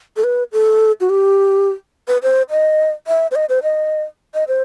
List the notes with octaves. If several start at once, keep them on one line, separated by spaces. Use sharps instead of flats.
A4
B4
A4
F#4
G4
B4
C5
D#5
E5
C5
D#5
C5
D#5
D#5
C5